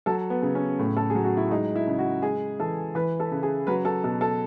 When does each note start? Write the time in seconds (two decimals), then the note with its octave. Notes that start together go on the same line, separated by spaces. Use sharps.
0.06 F#3 A4
0.30 B3
0.42 C#3
0.55 C#4
0.79 A2
0.96 A4
1.10 F#3 G#4
1.24 F#4
1.37 E4
1.51 G#3 D#4
1.76 E4
1.88 C#3
1.99 F#4
2.22 G#3 G#4
2.60 E3 A4
2.95 E3 B4
3.20 A4
3.32 C#3
3.43 G#4
3.67 F#3 B4
3.85 A4
4.04 B2 A4
4.21 A4